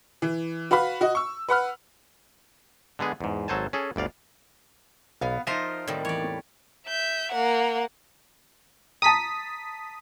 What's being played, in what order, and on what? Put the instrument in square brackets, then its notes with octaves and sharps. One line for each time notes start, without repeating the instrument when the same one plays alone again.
[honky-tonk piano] E3
F#4 B4 F5 B5
F#4 D#5
C#6 E6
B4 F#5 B5 F6
[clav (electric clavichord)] D3 G#3 B3 G#4
E2 G#2
G#1 F#3 A4 C5 G#5 A5
C#4 G#4 A4
G1 D2 D5 F5
[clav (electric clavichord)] B1 [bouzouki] B3 F5
[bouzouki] F3 [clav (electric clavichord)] D#4 C5 E5 [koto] F4 A#4 D#5
[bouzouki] A2 G3 [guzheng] D#3 C4
[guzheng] E2 [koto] C#5 D5
[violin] E5 G6
A#3 F#5
[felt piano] A5 A#5 [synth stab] D#6 B6